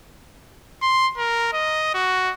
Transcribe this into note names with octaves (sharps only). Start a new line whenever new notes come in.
C6
A#4
D#5
F#4